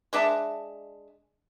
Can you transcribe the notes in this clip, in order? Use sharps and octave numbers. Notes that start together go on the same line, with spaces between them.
G#3 D4 E5 A5